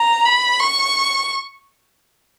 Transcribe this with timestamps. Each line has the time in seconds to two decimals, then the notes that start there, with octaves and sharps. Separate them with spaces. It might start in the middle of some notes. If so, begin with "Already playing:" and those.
Already playing: A#5
0.25 B5
0.59 C#6